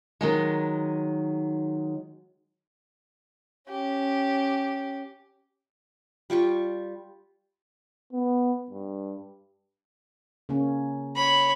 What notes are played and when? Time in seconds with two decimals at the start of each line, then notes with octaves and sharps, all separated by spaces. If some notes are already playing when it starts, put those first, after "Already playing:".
0.21 D#3 F#3 G#3
3.69 C#4 G4
6.30 G3 F4 G4 C#6
8.13 B3
8.70 G2
10.49 C#3 A#3 C#4
11.16 C#5 B5